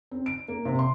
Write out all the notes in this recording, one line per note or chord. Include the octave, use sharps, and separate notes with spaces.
C4
D7
A#3
C3
C6